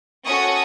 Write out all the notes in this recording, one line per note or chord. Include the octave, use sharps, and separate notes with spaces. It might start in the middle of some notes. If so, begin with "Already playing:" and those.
C#4 F#4 A4 C#6 D#6